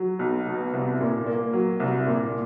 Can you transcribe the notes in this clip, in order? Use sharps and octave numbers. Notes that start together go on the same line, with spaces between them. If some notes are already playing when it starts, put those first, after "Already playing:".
Already playing: F#3
B1
B2
C2
A#2
A#3
F#3
C2
A#2